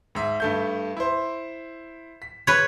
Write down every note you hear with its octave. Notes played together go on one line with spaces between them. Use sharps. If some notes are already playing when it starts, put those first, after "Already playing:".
G#2 E5
G2 A3 G6
E4 C5
B6
B4 C#5